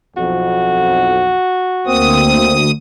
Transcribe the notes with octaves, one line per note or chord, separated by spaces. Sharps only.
B1 F2 F#4
D2 A#3 C4 D#6